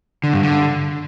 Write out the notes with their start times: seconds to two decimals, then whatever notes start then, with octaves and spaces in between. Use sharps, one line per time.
0.24 D3
0.34 G2
0.44 D3